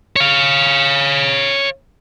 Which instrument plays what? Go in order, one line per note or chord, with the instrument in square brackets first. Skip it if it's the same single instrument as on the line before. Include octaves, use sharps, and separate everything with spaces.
[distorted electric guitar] C#5 F5